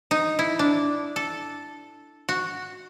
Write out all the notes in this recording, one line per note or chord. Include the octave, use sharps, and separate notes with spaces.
D#4
E4
D4
A4
F#4